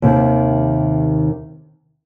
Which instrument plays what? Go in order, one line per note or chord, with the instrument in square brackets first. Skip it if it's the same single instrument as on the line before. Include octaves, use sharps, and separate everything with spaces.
[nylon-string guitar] D#2 C3 D#3